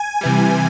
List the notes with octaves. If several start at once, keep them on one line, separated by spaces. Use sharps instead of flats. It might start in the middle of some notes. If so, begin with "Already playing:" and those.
Already playing: G#5
C3 E3 G3